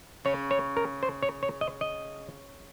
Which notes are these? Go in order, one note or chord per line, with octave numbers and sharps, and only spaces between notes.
C#3 C#5
C#5
A#4
C5
C#5
C#5
D#5
D#5